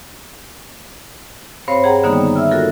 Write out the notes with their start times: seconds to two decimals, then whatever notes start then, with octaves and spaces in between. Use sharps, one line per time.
1.68 G2 C4 C5 C#5 F5
1.84 G#4 F#5 G5 A#5
2.04 D3 D#3 G3 A#3 B3 D#4
2.35 E5 E6 F6
2.51 F4 F#4 A4 A#4